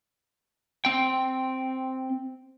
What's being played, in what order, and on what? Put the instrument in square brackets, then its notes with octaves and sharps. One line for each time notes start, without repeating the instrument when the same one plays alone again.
[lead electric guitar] C4 G5